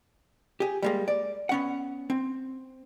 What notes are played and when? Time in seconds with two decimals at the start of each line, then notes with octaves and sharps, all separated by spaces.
0.60 G4 G#4
0.83 G3 G#3 A#3
1.08 D5
1.49 B3 C#4 F#5
2.10 C4